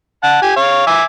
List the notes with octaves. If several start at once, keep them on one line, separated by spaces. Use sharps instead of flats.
F#5 A5
G4 G#5
C#5 F5
E5 G#5 D6